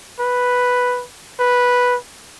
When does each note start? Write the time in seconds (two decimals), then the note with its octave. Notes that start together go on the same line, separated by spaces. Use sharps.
0.20 B4
1.40 B4